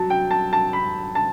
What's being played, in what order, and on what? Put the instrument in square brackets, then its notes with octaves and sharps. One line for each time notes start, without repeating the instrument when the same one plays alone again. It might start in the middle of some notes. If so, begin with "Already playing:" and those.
Already playing: [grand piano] F#3 A5
G5
A5
A5
B5
A5